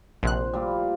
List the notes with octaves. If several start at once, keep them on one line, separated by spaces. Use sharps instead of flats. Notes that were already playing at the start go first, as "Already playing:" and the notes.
A#1 C3 C5 F#6
A#2 G3